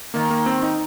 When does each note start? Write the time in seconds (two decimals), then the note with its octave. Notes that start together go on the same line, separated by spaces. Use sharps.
0.14 D#3 A#3
0.30 A#3
0.46 C4
0.63 D#4